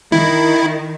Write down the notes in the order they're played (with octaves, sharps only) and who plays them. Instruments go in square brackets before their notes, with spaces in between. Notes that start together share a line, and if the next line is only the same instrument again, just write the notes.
[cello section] D#3 [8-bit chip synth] E4